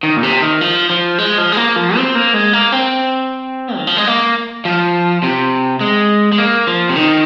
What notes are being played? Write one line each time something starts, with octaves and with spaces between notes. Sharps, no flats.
D#3
A#2
C3
D#3
F3
F3
G#3
F3
G#3
A#3
F3
C4
A#3
G#3
A#3
C4
D#3
F3
G#3
A#3
F3
C3
G#3
G#3
A#3
F3
C3
D#3